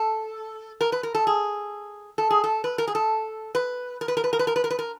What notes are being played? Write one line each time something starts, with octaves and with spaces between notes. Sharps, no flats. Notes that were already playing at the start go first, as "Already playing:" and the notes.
Already playing: A4
A#4
B4
A#4
A4
G#4
A4
G#4
A4
B4
A#4
G#4
A4
B4
A#4
B4
A#4
B4
A#4
B4
A#4
B4
A#4
B4
A#4